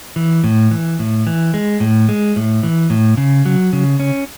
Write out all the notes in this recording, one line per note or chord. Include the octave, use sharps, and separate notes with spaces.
E3
A2
E3
A2
E3
G#3
A2
G#3
A2
E3
A2
C#3
F#3
C#3
C#4